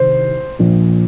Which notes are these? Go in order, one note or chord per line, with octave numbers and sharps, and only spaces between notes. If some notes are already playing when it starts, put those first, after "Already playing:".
Already playing: C2 C3 D#3 C5
A#1 A#2 F3